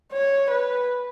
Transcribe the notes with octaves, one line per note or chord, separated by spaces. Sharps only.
C#5
B4